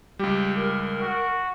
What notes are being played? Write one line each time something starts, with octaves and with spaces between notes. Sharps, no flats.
C#2 G3 G4
A#4
F#4